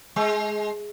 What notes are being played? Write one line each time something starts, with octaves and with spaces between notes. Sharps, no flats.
G#3